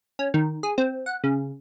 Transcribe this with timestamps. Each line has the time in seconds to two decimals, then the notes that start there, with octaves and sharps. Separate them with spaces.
0.19 C#4
0.34 D#3
0.63 G#4
0.78 C4
1.06 F#5
1.24 C#3